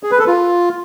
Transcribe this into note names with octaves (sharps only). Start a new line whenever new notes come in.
G#4
B4
A4
F4